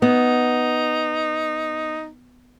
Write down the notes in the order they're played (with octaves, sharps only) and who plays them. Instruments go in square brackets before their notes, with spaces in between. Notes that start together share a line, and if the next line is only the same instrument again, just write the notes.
[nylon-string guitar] B3 [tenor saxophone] D#4